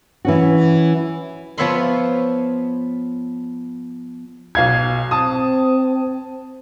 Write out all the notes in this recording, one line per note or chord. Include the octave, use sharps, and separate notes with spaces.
E3 C#4 F#4
F3 B3 C#5 E5 B5 C6
B1 F5 G#6
C4 A5 D#6